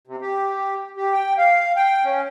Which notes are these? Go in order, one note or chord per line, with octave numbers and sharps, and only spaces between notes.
C3
G4
G4
G5
F5
G5
C#4